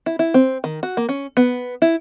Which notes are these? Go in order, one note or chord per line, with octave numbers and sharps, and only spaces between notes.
E4
E4
C4
D#3
F#4
A#3
C#4
B3
E4